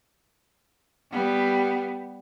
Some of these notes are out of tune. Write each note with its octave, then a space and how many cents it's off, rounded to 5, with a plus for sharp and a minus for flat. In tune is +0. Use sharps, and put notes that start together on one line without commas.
G3 +0 B3 +5